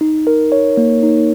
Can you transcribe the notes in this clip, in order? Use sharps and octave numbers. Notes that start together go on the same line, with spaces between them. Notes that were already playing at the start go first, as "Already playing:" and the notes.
D#4
A#4
C#5
A#3
D#4